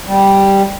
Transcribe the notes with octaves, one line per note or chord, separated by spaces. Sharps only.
G3